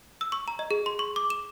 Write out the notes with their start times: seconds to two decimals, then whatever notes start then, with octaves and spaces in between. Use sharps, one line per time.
0.21 E6
0.32 C#6
0.48 A#5
0.59 D#5
0.71 G#4
0.86 C6
0.99 C#6
1.16 D6
1.30 E7